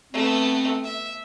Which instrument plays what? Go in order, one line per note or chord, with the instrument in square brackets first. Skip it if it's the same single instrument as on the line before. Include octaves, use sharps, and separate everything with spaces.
[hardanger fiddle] A3 B3 [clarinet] C4
[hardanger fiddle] E5